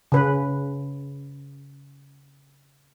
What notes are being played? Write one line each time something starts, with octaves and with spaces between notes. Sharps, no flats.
C#3 B4